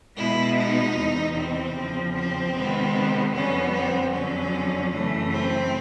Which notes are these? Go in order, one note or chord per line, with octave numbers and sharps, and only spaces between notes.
B2 G#3 B3 E4
D#4
E2 C3 E3
C4
E2 C#3 F3
C4
C3 D#3 G#3 B3
F2 D3 G3 B3 C#4
C4
F2 D3 F#3 C#4
F#2 C#3 E3 A3
C4